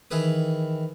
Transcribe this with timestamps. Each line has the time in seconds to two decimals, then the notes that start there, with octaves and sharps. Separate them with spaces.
0.11 D#3 E3 G#4 B4 D#6